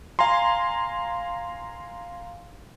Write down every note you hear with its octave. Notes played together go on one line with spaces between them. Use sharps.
F5 G#5 A#5 C6